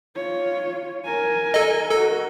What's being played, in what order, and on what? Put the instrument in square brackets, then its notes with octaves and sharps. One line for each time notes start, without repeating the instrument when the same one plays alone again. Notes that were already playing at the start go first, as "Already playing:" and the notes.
[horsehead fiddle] F4 C#5
A#4 G#5
[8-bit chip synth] A4 D#5
[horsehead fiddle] F#4 A#4 [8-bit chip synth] A4